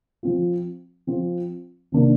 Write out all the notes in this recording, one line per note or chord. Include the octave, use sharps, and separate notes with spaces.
F3 C4 F4
F3 C4 F4
C3 D#3 A#3 D4